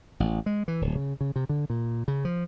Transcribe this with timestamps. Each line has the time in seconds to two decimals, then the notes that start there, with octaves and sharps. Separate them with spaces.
0.20 A1
0.46 G#3
0.68 E3
0.81 D1
0.95 C#3
1.21 C#3
1.36 C3
1.49 D3
1.70 A#2
2.08 C#3
2.25 F3